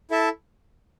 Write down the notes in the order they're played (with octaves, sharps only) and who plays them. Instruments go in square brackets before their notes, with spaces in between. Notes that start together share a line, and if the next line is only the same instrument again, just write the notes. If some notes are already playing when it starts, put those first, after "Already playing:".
[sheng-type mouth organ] E4 A4 E5 A5